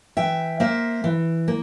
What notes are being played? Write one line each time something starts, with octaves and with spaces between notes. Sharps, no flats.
E3 E5 G5
A#3 C5 E5
E3
A#3